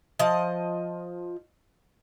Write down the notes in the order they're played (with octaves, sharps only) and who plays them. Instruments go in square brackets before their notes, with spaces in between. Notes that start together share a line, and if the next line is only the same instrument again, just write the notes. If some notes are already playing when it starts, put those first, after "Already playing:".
[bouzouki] F3 D#5